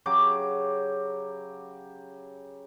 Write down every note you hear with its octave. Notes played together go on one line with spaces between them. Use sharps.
C#3 F#3 G4 D6